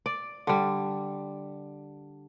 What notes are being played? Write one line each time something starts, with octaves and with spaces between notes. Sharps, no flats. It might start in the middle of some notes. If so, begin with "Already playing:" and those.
D5
D3 G3